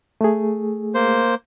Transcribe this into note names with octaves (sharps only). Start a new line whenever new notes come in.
A3 G#4
A#3 C5